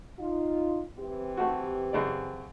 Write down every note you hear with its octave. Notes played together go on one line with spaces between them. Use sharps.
D#4 F4
E3 C4 G4
A3 F#4
F#2 C#3 D5